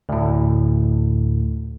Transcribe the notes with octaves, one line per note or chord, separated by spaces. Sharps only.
D2 A2